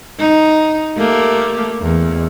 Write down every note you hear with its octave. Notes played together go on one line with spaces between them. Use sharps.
D#4
A3 A#3 G4
E2